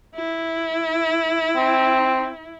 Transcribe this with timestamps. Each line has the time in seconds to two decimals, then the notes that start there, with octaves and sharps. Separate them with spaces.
0.15 E4
1.56 C4